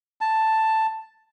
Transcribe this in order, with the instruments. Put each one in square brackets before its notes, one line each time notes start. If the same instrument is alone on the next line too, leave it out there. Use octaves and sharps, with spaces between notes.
[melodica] A5